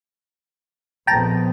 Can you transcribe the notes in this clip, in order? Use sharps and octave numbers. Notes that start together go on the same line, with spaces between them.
A#1 F2 B3 G5 A5 A#5